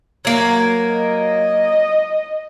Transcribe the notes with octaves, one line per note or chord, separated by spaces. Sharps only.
F#3 A#3
D#5